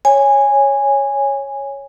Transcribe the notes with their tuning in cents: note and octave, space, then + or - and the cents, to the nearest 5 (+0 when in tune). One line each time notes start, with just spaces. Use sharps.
C#5 +0 G#5 -15